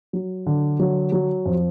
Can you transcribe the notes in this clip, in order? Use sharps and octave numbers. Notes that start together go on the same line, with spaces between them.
F#3
D3
F#3
F#3
F2